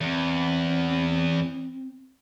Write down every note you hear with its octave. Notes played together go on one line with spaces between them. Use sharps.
E2 C4